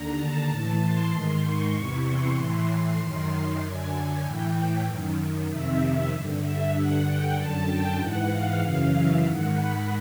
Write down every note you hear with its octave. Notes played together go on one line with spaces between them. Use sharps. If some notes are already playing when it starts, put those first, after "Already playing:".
Already playing: D#2 D3 A#5
A5
A2 E3 A5
C6
G#2 D#3 C6
C#6
E2 C3 E3 C#6
C6
A2 E3
C6
F#2 D#3 C6
C6
F#2 D3 G#5
G#5
A2 E3 G5
F#2 D#3
F2 C3 D#3 E5
G2 D3
E5
G2 D3 F#5
G5
F#2 D3 A5
G5
G#2 E3 F#5
F5
F#2 C#3 E3 F5
E5
G#2 D#3 F#5
B5